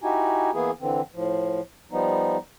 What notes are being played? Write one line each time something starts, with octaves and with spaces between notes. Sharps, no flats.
D#4 E4 F#4 G4 G#5
E3 A#3 B3 E4 G#4
D3 E3 C4
A2 F3
F3 G3 B3 D#4